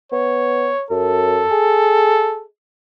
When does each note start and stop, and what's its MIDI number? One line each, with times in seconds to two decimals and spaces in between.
0.12 0.71 59
0.12 0.85 73
0.91 1.44 42
0.91 2.44 69
1.52 2.46 68